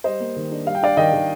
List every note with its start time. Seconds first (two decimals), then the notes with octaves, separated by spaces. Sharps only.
0.04 G3 C5 D#5
0.20 A#3
0.36 D#3
0.52 D4
0.66 G3 F5
0.75 G5
0.83 D4 D5 F5
0.97 D#3 D#5 G5
1.13 D#3